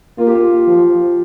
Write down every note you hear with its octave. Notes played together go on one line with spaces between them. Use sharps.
A#3 F4
G4
F4
F3